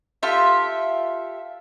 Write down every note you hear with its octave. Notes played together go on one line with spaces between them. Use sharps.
F4 G4 A4 E5